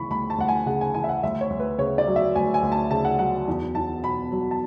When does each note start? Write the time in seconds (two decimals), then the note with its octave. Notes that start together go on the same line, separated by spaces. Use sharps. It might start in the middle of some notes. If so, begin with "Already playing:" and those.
Already playing: D2 C#3 E3 B5 C#6
0.10 D2 B5
0.30 A5
0.38 D2 F#5
0.48 G#5
0.66 C#3 F#5
0.81 G#5
0.94 E3 G#5
1.04 E5
1.09 F#5
1.23 D2 E5
1.41 C#5
1.50 D2
1.60 B4
1.78 C#3 C#5
1.98 D5
2.07 F#3
2.16 E5
2.35 D2 G#5
2.54 G#5
2.63 D2
2.72 A5
2.91 C#3 A5
3.05 F#5
3.19 F#3 F#5
3.48 E2
3.75 E2 A5
4.03 B2 B5
4.32 F#3
4.51 A5